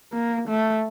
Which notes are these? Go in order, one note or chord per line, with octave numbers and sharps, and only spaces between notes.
A#3
A3